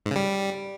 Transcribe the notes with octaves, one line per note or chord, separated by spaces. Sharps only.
G#2
C#3
G3